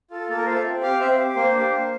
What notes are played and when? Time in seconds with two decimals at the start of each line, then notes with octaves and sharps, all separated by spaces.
0.10 F4 A4
0.29 A#3 A4
0.38 A#4
0.46 F4 A4 C5
0.56 E5
0.65 C4
0.82 G4 F5
1.00 C4 E5
1.12 C5
1.18 G4
1.35 A#3 C5
1.53 D4 G4
1.72 A#3